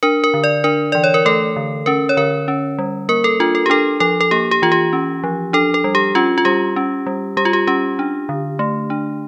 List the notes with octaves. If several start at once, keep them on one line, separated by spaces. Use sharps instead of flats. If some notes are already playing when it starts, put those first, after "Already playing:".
D4 A#4
A#4
D3
D5
D4 A#4
E3 D5
C#5
A#4
A3 A4
D3
C#4 A#4
C#5
D3 A#4
C#4
G3
A#3 A#4
A4
D4 F4
A4
G4
D4 A4
F3 A4
A4
A#3 G4
G4
E3 F4
G4
C#4
F3
D4 A4
A4
G3
G4
C#4 F4
F4
G3 G4
C#4
G3
G3 G4
F4
G4
C#4 G4
D4
D3
A3
D4